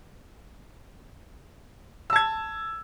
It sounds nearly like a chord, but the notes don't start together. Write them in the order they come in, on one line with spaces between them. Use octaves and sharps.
E6 A5 G#6